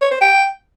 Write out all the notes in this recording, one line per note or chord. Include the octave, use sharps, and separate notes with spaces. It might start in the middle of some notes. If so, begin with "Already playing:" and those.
C#5
C5
G5